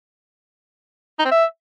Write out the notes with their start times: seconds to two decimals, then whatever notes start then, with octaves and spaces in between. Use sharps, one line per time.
1.19 D#4
1.25 C4
1.31 E5